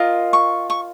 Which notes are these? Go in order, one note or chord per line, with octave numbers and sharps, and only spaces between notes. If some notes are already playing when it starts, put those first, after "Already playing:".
Already playing: F4 A#4 D#5
C#6
C#6